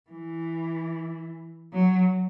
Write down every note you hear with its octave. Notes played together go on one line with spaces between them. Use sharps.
E3
F#3